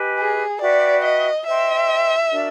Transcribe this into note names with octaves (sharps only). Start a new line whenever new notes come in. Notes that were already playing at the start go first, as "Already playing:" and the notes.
Already playing: G4 B4 D#5 G#5
G#4
F#4 B4 D5 E5 G5
D#5
C5 D#5 E5 G5 C6
D4 F#4 A#4 D5